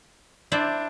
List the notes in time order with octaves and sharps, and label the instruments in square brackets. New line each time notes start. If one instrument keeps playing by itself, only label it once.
[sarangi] D4 [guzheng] E4 C5 D5